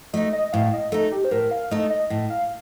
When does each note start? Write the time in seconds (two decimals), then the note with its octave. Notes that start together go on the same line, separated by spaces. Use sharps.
0.13 A3 D#4 D#5
0.33 D#5
0.53 A2 F5
0.74 D#5
0.92 A3 D#4 A4
1.12 G4
1.24 C5
1.31 A2 A#4
1.51 F5
1.71 A3 D#4 A4 D#5
1.90 D#5
2.10 A2
2.30 F5